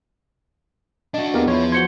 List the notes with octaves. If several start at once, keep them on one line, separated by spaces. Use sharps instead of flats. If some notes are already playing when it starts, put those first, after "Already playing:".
D4 F#4 D#5
E2 A#3 G4 A#4
F3 E4 C#5
F#4 C5 C6 G#6 C#7 G7